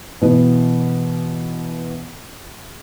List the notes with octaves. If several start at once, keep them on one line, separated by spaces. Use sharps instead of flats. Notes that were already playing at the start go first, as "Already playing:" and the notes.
B2 E3 B3